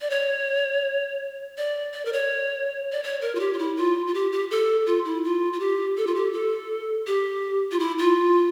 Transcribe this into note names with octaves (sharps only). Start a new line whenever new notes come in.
D5
C#5
D5
D5
A#4
C#5
D5
C#5
A#4
F4
G4
F4
E4
F4
F4
G4
G4
A4
F4
E4
F4
F4
G4
A4
F4
G4
A4
G4
F4
E4
F4